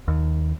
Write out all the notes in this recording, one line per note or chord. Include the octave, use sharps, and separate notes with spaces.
D#2